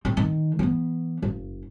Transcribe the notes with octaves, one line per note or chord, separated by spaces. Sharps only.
G1 C4
D#3
E3 B3
F#1